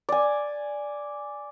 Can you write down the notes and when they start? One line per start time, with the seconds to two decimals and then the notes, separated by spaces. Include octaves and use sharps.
0.09 D5 G#5